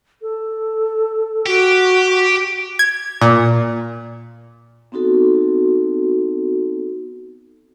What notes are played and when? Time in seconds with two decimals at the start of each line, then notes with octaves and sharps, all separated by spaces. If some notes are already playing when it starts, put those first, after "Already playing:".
0.22 A4
1.46 F#4 G4
2.79 G#6
3.21 A#2
4.92 B3 C4 D#4 F#4 A4